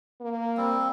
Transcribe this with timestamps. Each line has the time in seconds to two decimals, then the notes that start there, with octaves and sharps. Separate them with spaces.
0.21 A#3
0.57 G3 C4